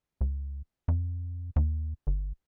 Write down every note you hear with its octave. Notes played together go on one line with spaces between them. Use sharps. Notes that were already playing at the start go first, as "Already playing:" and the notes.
C#2
F2
D#2
G1